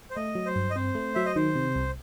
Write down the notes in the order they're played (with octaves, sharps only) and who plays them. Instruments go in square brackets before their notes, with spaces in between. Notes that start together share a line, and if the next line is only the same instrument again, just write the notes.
[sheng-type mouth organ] C5
[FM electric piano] A3 [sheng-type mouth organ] D#5
[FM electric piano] F#3
[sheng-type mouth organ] C5
[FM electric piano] G2
[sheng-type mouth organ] D#5
[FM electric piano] C4 [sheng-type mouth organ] C5
[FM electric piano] A3
[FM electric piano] F#3 [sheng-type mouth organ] E5
[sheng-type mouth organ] D#5
[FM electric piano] D#3 [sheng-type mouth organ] C5
[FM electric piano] C3
C2